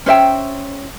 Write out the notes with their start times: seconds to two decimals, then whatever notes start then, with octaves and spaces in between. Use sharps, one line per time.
0.06 C#4 C5 E5 G5